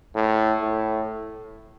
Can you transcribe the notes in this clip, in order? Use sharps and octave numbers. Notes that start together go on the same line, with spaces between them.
A2
A2